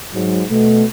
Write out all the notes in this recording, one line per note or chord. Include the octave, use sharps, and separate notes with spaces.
G#2 F#3
B2 A3